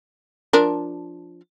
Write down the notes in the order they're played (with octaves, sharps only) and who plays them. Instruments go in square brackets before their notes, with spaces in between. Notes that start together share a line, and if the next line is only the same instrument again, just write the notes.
[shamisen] F3 D4 A#4